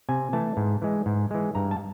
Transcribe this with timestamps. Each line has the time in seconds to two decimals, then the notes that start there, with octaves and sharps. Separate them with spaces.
0.09 C3 G#5
0.33 E3 A3 A5
0.57 G#2
0.82 E3 G#3
1.06 G#2
1.31 E3 G#3
1.55 G2 A#5
1.71 A5